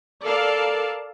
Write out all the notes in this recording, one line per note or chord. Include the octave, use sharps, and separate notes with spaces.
A4 A#4 D5 F5 A5